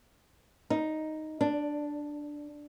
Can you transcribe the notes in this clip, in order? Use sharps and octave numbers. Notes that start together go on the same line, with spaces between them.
D#4
D4